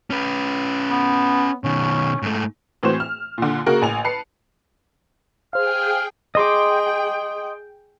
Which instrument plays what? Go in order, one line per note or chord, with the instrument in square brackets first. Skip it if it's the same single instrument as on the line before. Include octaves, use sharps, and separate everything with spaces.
[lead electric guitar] C#4 B4
[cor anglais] B3
[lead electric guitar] B2 D#3 [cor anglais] C#4
[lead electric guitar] G#2 A3
[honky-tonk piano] A2 E3 C4 F#4 C5 E7
F6
A#2 D3
C#3 A#3 F#4 A#4
A1 G#5 F7
B4 A5 C7 C#7
[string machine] G#4 G5 [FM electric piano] C5 F5 [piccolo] F6
[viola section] G#4 G5 [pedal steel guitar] D#5 C6 D6